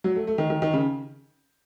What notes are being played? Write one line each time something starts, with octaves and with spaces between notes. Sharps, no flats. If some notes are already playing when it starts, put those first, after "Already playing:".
F#3
A3
A3
D#3
D#3
D#3
C#3